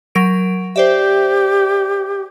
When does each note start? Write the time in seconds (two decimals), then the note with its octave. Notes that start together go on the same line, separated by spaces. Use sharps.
0.15 F#3 A#4 D7
0.76 G4 C5 D5 E5